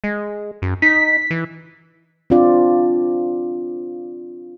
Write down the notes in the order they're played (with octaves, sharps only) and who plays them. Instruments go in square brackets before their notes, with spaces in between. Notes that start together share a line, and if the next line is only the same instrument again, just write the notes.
[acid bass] G#3
F#2
[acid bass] D#4 [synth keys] B6
[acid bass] E3
[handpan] C4 D4 F4 D5